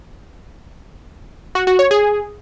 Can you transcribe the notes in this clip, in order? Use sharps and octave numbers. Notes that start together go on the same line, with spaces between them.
F#4
F#4
C#5
G#4